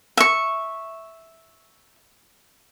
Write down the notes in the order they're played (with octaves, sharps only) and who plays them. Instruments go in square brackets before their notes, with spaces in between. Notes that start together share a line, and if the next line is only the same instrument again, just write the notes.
[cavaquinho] E5 C#6